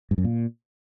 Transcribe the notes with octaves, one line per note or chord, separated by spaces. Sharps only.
G2
F#2
A#2